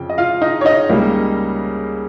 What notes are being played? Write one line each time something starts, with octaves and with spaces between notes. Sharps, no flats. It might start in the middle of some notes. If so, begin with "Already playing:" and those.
Already playing: F2 C#3 G5
D#5
F4 F5
D#4 D#5
C#5
D#4 D#5
C#2 C#3 G3 A#3